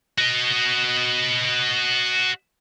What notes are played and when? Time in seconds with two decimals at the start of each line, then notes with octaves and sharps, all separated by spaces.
0.18 F#4 D#5